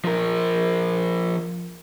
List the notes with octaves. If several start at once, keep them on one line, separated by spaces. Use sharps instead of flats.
F3 A#4